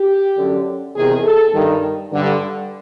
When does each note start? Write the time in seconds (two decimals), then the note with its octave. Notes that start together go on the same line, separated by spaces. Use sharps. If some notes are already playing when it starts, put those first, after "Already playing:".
Already playing: G4
0.37 F#2 D3
0.96 E2 C3 D#3 G#4
1.24 A4
1.54 G2 D#3
2.12 G2 D3